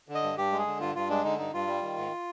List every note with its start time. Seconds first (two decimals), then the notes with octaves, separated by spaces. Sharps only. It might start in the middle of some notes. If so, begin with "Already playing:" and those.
0.09 D3
0.15 D#5
0.23 G2
0.37 G2 G4
0.52 G#3
0.58 G#4
0.67 D3
0.80 G2 F4
0.95 G2 F4
1.09 G#3 D4
1.24 D3 D#4
1.38 G2 D#4
1.53 G2 F4
1.67 G3
1.83 D#3
1.97 G#2